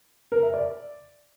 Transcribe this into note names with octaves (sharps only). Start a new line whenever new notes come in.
A#4
E5
D5